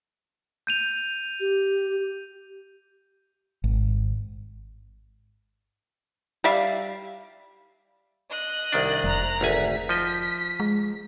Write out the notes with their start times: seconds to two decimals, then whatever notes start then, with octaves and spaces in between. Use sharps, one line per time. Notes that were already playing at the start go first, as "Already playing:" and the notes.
0.67 G6 D#7 F7
1.40 G4
3.64 G#1
6.44 G3 E5 F5
8.30 D#5 F#6
8.72 C2 D#3 D4
9.04 F1 A#5 F#6
9.41 G#1 D2 G#5 B6
9.89 F3 D#5
10.60 G#3